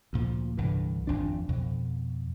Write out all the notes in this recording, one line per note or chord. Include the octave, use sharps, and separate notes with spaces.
D2 A#2 F3
C2 G2 D3 E3
G#1 F2 F3 D4
F2 B2